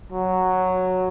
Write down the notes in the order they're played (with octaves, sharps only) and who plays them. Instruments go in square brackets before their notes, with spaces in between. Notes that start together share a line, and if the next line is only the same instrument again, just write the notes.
[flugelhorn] F#3